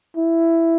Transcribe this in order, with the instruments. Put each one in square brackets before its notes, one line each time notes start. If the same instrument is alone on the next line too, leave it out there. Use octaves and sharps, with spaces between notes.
[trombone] E4